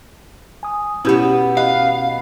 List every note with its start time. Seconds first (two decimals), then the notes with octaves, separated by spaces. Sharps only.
0.63 G#5 D#6
1.05 B2 B3 C#4 E4 G4 E6
1.57 B4 D#5 F5